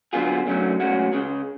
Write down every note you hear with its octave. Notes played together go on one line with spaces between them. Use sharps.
D3 F#3 B3 F4 G#4
F#2 D3 F#3 A3 C#4
B1 A2 G#3 C#4 F#4
C#2 C#3 G#3